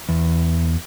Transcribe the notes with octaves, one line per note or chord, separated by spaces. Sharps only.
E2